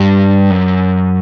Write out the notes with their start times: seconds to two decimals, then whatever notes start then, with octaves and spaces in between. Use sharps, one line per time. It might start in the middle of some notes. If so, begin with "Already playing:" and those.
Already playing: G2
0.50 F#2